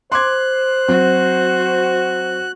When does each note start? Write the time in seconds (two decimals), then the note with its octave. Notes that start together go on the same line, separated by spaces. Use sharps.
0.12 C5 C6 D6 F#6 G#6
0.88 F#3 C4 F#4